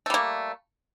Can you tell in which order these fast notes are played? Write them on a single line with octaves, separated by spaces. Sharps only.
A3 G3 A#3